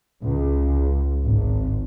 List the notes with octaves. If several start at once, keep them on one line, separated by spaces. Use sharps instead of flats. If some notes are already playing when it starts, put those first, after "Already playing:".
C#2
G#1